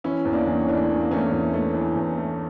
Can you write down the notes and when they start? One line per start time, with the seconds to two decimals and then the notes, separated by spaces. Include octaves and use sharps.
0.04 E3 C#4 E4
0.25 E2
0.32 A#3 D4
0.47 E2
0.61 C#4
0.68 E3 D4
0.78 A3 C#4
0.89 A3 C#4
1.00 A#3
1.11 E2 A3 C#4
1.32 E2
1.54 A3
1.74 E3
1.96 E2
2.17 A3